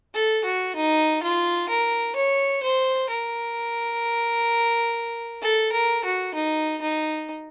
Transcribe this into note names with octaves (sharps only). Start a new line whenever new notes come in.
A4
F#4
D#4
F4
A#4
C#5
C5
A#4
A4
A#4
F#4
D#4
D#4